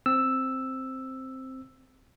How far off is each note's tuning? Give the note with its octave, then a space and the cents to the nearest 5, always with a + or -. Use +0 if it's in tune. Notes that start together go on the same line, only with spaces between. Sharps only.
C4 +0 E6 +0